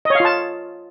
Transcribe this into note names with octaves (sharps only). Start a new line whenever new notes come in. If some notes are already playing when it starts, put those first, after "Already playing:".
F4 C#5 D#5 F5 A5